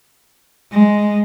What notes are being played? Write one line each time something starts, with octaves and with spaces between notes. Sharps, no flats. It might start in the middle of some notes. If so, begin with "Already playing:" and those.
G#3